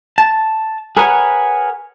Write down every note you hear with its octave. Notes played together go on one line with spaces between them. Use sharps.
A5
G#4 A#4 B4 C#5 F#5 G#5